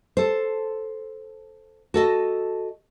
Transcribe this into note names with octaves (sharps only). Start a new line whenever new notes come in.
A4 C5
F#4 A4 D#5